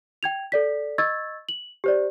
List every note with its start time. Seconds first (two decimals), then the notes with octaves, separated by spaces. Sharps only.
0.23 G5 G#6 F7
0.52 A4 D5 B6
0.98 D#5 C#6 E6 G#6 A6
1.49 F#7
1.84 G4 C5 D5